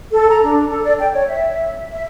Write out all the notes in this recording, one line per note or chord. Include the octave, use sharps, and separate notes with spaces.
A4
A#5
D4
A4
D5
G5
C#5
E5
E5